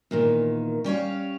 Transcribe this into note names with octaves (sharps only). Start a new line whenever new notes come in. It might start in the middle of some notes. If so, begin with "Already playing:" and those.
E2 A#2 D#3
G3 C#4 C#5 F5